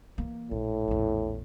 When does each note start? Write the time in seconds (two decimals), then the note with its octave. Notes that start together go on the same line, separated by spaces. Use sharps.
0.18 E3 A#3
0.51 A#1 A2
0.88 A#1 E2